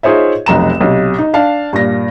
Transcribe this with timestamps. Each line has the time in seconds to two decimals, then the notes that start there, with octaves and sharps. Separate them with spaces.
0.03 D#4 F4 G#4 C5 C#5 E5
0.46 F1 B1 A#5 E7
0.81 B1 C3
1.18 D#4
1.34 D4 F5 A5
1.73 G2 A#2 A#6